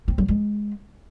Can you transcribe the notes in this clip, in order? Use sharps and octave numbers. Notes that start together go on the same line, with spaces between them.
C4
F#3
G#3